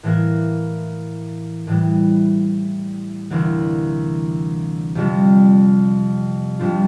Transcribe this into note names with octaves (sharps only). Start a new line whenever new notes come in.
A2 E3 A#3
A2 E3 G3
D2 C3 E3 A#3 E4
F2 C3 G3
F2 C3 G3 D4 F4